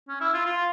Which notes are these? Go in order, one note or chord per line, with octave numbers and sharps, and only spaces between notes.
C#4
E4
F4
F4